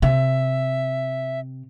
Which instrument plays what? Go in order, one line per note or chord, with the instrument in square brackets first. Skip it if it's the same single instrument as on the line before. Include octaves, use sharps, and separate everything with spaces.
[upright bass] C3 [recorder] E5